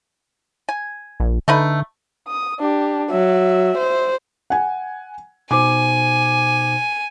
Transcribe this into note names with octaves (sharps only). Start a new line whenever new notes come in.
G#5
A#1
D3 A3 D#4 B4
D#6
D4 G4
F#3 E5
C5
F#5 G#5
B2 D#4 C5 G#5 D6